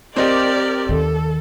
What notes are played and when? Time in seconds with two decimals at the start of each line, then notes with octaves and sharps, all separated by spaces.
0.16 C4 G4 A#4 D5 D#5
0.89 D#2 D#3 A4